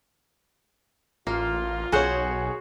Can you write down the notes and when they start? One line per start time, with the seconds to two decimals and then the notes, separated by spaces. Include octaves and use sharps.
1.27 A1 A#3 F4
1.92 B1 F#4 G#4 C5 C#5 F#5